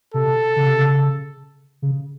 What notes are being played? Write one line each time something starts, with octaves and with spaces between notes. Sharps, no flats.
C3 A4
C#3
C3
C#3
C#3